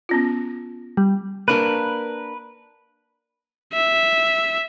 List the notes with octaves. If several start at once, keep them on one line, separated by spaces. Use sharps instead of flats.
B3 C#4 F4
G3
A#3 D4 A#4 B4
E5